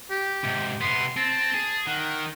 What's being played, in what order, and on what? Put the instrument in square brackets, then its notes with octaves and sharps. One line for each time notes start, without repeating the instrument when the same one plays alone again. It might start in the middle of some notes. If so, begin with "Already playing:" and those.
[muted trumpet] G4
[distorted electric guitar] G#2 C3
[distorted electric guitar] C3 B3 [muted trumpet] C6
[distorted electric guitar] C4 [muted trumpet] A5
[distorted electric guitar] G#4
[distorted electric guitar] D#3 [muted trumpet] F#5